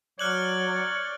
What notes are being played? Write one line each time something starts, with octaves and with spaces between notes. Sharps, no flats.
F#3 C#5 D5 F6 F#6 F#7